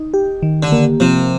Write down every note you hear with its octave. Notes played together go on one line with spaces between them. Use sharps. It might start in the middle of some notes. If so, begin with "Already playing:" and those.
Already playing: D#4
G4
D#3
D3
A#3
C3 F3